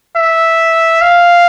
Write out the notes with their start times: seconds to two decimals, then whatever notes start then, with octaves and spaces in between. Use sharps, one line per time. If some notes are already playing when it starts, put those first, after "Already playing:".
0.16 E5
1.01 F5